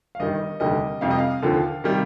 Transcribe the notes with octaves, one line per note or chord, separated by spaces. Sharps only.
F5
G1 G2 D#3 G3 D#5
F1 D#2 D3 G3 D#5
F1 F2 C3 G3 F5
D#5
F5
D#2 D3 F3
C3 D#3 G3